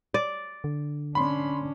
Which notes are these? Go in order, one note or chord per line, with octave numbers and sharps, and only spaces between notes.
D5
D3
C#4 D4 B5 C6